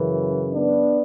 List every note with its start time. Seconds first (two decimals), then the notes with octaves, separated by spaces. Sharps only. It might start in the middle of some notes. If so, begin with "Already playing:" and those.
Already playing: F#2 C#3 E3
0.53 B3 D4